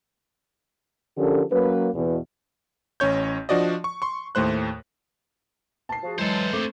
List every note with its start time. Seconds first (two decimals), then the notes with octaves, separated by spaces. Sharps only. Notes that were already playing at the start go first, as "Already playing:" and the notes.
1.17 D3 F3 C#4 G4 A4 A#4
1.51 F#3 A#3 C#4 B4
1.95 E2 B2
3.00 A1 C#4 C#5 G6
3.49 F3 D4 F#4 D5 D#5
3.84 C#6
4.02 C6 C#6
4.35 D#2 A2 A3 C5 F#6
5.89 A5 C7
6.03 F3 F#4 G#4
6.18 E3 F#3 G#3 A4 C5
6.53 A3 C4 D6